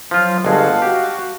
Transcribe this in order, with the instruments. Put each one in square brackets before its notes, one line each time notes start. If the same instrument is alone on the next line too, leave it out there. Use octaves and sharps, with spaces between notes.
[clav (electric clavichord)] F3 F4 [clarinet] F#3
[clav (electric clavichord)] G1 G#3 [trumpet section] D#5 F#5 A5 [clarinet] F5
[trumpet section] F#4 [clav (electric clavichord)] G4